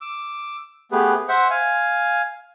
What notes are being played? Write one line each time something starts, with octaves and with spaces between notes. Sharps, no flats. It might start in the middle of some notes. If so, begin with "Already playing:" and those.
D6 E6
A3 B3 G4 G#4 B4
C5 E5 F#5
F5 G#5